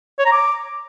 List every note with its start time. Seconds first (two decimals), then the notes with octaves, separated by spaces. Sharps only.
0.19 C#5
0.26 A#5
0.32 D6